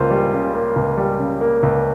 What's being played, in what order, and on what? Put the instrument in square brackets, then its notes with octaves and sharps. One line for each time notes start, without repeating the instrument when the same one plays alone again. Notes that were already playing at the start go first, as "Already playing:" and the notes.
Already playing: [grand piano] C#2 C#3 A#3 F4 C5
G3
C#3
A#3
C#2
G3
C#3
A#3
C#2